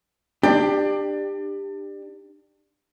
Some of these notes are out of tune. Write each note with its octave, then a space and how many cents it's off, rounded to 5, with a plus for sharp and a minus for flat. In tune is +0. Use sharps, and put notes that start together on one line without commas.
D4 +25 G4 +15